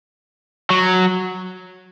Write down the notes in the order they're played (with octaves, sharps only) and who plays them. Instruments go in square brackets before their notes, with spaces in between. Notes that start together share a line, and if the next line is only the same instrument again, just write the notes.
[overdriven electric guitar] F#3